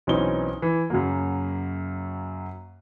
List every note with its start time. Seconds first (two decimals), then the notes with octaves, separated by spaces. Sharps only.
0.07 B1 E3 C4 C#4 D#4 G7
0.62 E3
0.90 F#2 C#3 F#3 A#3